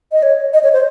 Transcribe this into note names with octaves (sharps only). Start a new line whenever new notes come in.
D#5
C#5
D#5
C#5
C5